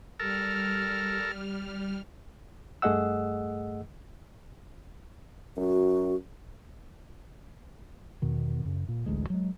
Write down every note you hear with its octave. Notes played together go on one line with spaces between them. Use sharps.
G3 A4 A#4 F6
G2 A3 G#4 D#5 F#5 E6
F#2 F#4
E2 B2 D#3
F#2 C#3
A#2
D1 A1 D2 G#3
F#3 G#3